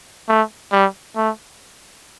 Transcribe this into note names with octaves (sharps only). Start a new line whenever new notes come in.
A3
G3
A3